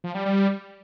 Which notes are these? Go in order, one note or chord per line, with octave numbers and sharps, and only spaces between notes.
F3
G3
G3